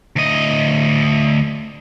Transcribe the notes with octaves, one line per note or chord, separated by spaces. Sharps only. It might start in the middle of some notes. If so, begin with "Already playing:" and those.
D2 D#5